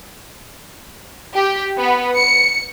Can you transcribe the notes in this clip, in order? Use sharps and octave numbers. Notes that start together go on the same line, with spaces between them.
G4
B3
C#7